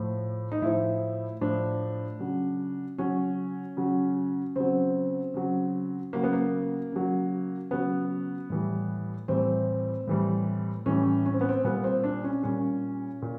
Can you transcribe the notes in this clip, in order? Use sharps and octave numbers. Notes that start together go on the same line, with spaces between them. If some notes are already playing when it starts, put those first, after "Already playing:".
Already playing: A2 F3
D#4
A2 F3 E4
A2 F3 D4
C#3 F#3
C#3 F#3 C#4
C#3 F#3
C#3 F#3 C4
C#3 F#3
C#3 F#3 A#3
B3
A#3
C#3 F#3
C#3 F#3 B3
A2 E3 G3
A2 E3 G3 C4
A2 E3 G3
A2 E3 G3 C#4
C#4
C4
B3
C4
A#2 G3 B3
C4
D4
C#4
A#2 G3 C#4
A#2